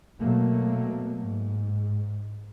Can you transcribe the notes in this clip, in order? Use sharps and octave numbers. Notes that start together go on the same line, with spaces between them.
B2 F#3 A3 A#3
G#2